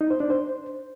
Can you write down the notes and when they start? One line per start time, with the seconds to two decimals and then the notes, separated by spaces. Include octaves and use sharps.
0.01 D#4
0.10 C5
0.20 D4
0.30 C5